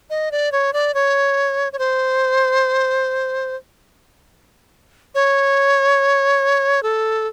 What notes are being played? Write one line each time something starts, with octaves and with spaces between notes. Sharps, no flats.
D#5
D5
C#5
D5
C#5
C#5
C5
C#5
A4